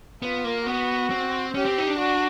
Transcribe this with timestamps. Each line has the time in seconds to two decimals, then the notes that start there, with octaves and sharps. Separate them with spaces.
0.22 B3 F4
0.44 A#3
0.66 B3 F#4
1.10 C4
1.54 C#4 G4
1.65 C4
1.78 D#4
1.87 D4
1.99 F#4